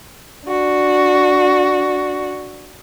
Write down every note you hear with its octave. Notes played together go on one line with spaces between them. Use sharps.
D4 F#4